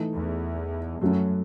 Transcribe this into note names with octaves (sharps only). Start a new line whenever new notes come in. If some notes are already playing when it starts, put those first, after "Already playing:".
Already playing: E3 A3 D#4
E2
F#2 F#3 A3 C#4